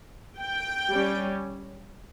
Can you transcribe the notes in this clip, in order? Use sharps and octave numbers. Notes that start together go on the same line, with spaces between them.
G5
G3 C#4